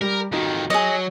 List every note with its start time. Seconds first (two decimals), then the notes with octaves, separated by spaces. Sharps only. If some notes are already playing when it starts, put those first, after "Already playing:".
0.01 G3 A#4
0.32 F2 D#3 D#4 F#4
0.70 F#3 G#4 D#5